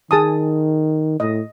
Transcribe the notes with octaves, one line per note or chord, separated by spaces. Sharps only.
D#3 G#4 A5 D#6
A2 D#5